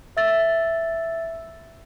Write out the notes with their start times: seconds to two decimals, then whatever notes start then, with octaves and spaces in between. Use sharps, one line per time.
0.17 E5 E6 A6